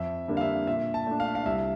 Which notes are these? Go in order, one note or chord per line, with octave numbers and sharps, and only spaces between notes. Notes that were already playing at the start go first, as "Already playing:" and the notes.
Already playing: F2 E5
D3 G3 A#3 D4
F5
E5
A#2 E5
A5
A3 D4
F5
F5
C2 E5